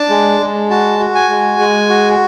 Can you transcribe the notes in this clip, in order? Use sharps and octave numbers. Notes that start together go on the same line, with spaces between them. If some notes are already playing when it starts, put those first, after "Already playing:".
Already playing: D4 A5
G#3
G#3
F#4 A5
F#4
G#5
G#3
G#3
F#4